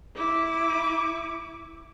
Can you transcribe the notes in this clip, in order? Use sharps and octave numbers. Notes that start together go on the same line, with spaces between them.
E4 D6